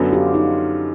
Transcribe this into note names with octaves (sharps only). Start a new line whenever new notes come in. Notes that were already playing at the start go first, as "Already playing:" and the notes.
Already playing: F#2 D3 F#3 B3
F4 G4
D#4 F4